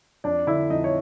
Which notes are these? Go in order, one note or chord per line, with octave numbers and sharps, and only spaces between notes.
F2 D4 D5
D3 E4 E5
F2 D#4 D#5
C#5